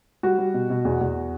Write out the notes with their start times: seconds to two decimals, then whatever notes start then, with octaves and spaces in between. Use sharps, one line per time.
0.23 G3 F#4
0.38 G3
0.54 B2
0.70 B2
0.85 E2
1.01 E2